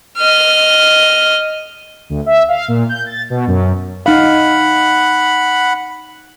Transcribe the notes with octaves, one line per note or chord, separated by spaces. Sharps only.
D#5 F6
D2
E5
F5
A#2
G6
A6
B2
F#2
D#4 F5 F#5 B5